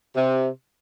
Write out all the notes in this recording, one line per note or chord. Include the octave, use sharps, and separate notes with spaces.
C3